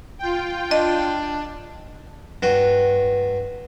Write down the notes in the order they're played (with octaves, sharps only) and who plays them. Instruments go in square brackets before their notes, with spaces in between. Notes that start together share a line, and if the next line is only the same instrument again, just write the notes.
[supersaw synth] F4 G5
[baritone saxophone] D4 [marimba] D#5
[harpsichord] G2 F#4